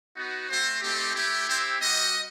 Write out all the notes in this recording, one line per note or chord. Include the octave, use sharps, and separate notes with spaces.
B3 D#4 F#4
A3 C4 F#4 C5
A3 C4 D#4 G4
A3 E4 G4
C4 E4 G4 C5
G3 C4 F#4 D#5